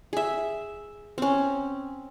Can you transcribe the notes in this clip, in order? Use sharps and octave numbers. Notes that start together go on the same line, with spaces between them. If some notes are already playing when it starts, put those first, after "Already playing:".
G#4 E5
C4 C#4